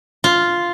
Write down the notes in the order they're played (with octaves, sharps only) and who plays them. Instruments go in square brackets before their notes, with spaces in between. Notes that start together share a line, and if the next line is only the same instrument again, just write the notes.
[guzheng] F4